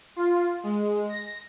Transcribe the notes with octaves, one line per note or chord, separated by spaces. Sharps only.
F4
G#3
A#6